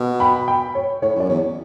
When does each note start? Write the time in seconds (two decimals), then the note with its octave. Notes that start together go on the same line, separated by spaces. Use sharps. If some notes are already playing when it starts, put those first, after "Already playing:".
Already playing: B2
0.20 G5 B5
0.48 G5 B5
0.75 C#5
1.02 A2 C#5
1.16 F#2 D5
1.29 E2 C#5